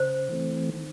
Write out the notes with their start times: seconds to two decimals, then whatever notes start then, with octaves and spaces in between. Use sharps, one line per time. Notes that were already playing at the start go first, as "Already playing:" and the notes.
Already playing: C#3 C5
0.29 E3 A3 C4
0.69 D#3